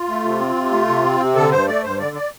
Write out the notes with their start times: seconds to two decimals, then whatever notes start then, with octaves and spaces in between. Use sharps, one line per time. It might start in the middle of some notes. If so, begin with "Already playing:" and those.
Already playing: F4
0.08 A3
0.24 C3
0.40 C4
0.55 C3
0.71 A3
0.87 C3
1.04 C4
1.20 C3
1.35 D3 A4
1.52 G2 C5
1.67 A3 D5
1.84 G2 C5
1.99 D3 D5
2.15 D5